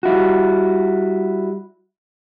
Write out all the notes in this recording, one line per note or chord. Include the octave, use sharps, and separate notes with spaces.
G3 E4 F#4